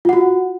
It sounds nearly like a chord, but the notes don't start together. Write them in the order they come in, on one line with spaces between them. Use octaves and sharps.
F4 F#5 F#4